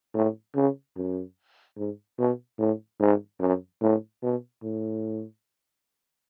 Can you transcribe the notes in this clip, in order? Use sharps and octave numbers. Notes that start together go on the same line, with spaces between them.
A2
C#3
F#2
G#2
B2
A2
G#2
F#2
A2
B2
A2